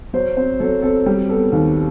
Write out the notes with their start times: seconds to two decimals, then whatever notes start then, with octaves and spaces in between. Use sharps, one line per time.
0.14 F#3 C5
0.37 C4 C5
0.60 F#3 A4
0.82 C4 A4
1.06 G3 G4
1.29 B3 A4
1.52 D#2